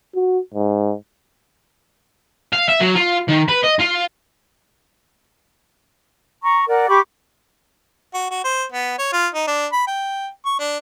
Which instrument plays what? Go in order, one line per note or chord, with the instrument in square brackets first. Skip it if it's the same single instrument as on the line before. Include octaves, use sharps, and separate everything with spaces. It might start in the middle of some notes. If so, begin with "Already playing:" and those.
[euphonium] F#4
G#2
[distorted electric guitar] F5
E5
F#3
F4
D#3
B4
D#5
F4
[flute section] A#5 C#6
A#4 D5 F#5
G4 B5 C#6 D6
[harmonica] F#4
F#4
C5
B3
C#5
F4
D#4
D4
B5
G5
C#6
D4